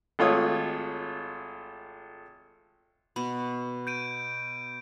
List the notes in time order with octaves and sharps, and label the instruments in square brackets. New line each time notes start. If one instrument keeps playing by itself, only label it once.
[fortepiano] G#1 A3 F4 C#5 D#6
[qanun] B2 [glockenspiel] B5
[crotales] G6 D7 D#7